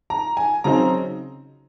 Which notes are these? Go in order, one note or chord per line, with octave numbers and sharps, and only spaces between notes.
A#5
G#5
C#3 F#3 C4 D#4 A#5